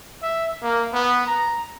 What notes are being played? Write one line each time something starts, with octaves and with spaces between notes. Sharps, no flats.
E5
A#3
B3
A#5